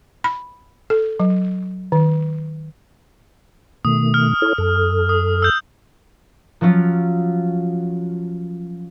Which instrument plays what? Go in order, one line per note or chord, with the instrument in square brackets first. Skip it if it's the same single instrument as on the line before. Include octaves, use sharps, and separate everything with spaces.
[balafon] B5
A4
F#3
D#3
[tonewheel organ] B2 D#3 A3 [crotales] D#6
[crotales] F6
[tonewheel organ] E4 A4 C#5
F#2 A4
[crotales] D#6
E6 G6
[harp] F3 F#3 C#4 F4